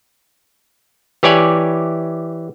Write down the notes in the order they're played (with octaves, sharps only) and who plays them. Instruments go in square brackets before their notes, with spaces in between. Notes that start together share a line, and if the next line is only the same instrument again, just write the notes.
[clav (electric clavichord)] E3 G4 C#5 D5 G#5